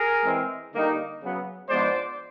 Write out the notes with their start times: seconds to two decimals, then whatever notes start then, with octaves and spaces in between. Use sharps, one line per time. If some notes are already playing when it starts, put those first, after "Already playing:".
Already playing: G#4 A#4
0.25 E3 G#3 C4
0.73 D3 G3 A#3 D#4
1.21 C#3 F#3 B3
1.69 G#2 F3 G#3 B3 D4 C5 D5